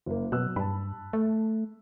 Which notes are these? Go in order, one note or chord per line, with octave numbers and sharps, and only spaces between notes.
F#1 A#3
B2 F#3 E6 F#6
G2 A5 B5
A3